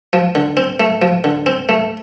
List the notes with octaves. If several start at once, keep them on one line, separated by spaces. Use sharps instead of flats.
F3
D3
C4
A3
F3
D3
C4
A3